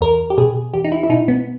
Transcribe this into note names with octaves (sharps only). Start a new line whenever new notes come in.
E2 A#4
G4
B2 G#4
E2 G4
D#4
E4
E4
B2 D#4
B3